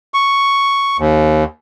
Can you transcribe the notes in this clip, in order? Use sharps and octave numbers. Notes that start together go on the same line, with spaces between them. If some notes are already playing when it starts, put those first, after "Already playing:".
C#6
D#2